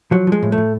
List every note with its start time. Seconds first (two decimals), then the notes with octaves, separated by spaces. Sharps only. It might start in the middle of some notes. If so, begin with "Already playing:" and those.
0.11 F3 F#3
0.27 F3 G#3
0.43 A2
0.52 A3
0.58 A2